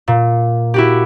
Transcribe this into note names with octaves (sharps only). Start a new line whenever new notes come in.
A#2
E4 F#4 G4